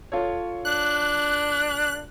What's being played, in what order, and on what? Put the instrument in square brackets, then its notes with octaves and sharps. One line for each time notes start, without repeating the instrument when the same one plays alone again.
[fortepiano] F4 A4 C#5
[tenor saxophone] D4 [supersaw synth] F#6